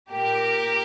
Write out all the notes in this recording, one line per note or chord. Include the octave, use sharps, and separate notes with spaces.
A#2 G4 A#4